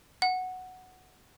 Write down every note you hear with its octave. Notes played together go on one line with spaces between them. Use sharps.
F#5